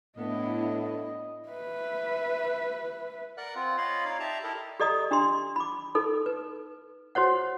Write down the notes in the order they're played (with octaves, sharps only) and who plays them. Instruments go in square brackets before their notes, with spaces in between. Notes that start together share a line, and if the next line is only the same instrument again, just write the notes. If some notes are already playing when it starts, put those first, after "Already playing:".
[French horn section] A2 [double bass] B3 [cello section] D4 E4 [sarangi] D#5
[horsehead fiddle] B4 E5
[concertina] A#4 D5 F#5 F#6
C4 F4 F#5
F4 C#5 D#5 F5 B5 C6
D#4 C#5 D5 F5
G4 D5 E5 A5 A#5
E4 G4 A4 A#4 D#5
[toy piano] G4 A4 D5 D#5 A#5 D#6
D4 G4 A#5 C6
B5 D6
D#4 A4 A#4
B4
F#4 C5 C#5 F#5